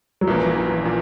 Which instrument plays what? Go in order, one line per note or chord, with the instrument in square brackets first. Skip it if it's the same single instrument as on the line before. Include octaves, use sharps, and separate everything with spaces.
[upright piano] F#3
[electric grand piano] A#1 A#2 A#3 C#4 [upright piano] E3
[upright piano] E3
[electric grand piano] A#2 A#3